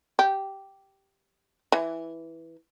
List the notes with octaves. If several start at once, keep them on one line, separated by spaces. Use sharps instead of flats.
G4
E3